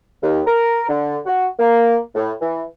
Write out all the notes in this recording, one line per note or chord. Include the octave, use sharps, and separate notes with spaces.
D#2
A#4
D3
F#4
A#3
A2
E3